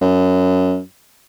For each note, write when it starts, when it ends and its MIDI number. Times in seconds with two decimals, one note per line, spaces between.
0.01 0.80 42